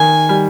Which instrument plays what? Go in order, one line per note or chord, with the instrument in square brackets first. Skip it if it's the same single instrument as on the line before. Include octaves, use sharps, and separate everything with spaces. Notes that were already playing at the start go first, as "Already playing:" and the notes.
Already playing: [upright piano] D#3 [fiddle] G#5
[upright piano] G3